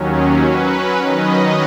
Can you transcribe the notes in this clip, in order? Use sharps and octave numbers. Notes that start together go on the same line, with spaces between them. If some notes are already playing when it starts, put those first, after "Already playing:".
Already playing: D#2 D#3 F#3 C#4
F#3 C#4 B4
D#3 F#3 C#4 B4 D#5